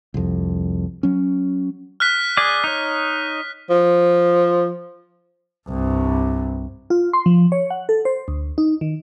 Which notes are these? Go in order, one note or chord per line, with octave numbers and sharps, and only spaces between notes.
C2 F2
F#3 C#4
F6 F#6 B6
G#4 D5 D6
D#4 C#5
F3
C2 G2
F4
C6
F3
C#5
F#5
A4
C5
D2
D#4
D#3